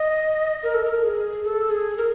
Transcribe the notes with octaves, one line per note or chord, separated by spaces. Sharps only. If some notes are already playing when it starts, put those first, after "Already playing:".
Already playing: D#5
A#4
A4
A#4
G#4
A4
G#4
A#4